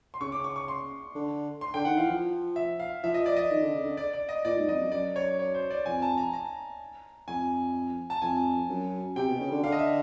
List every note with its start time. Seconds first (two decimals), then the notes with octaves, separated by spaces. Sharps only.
0.14 C6
0.21 C#3 C#6
0.32 D6
0.44 C#6
0.56 C#6
0.68 C6
1.15 D3
1.61 C6
1.74 D3 G5
1.85 D#3 F#5
1.97 E3 F5
2.09 F3
2.56 E5
2.80 F5
3.03 F3 E5
3.14 D#5
3.26 D5
3.36 D#5
3.51 D#3
3.63 D3
3.74 C#3
3.86 D3
3.97 D5
4.13 D5
4.29 D#5
4.45 A#2 D5
4.57 G#2
4.68 F2 D#5
4.80 F#2
4.92 F#2 D5
5.16 C#5
5.39 C#5
5.55 C5
5.71 D5
5.86 F2 G#5
6.02 A5
6.17 A#5
6.34 A#5
7.27 F2 G#5
8.10 A5
8.22 F2 G#5
8.69 F#2
9.16 C3 G5
9.28 B2
9.40 C#3
9.52 D3
9.63 D3 F5
9.72 D#5
9.79 E5